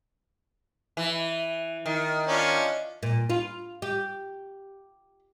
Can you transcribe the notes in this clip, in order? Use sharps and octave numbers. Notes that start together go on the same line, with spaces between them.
E3
D#3
C#4 D4 F4
A#2
F4
G4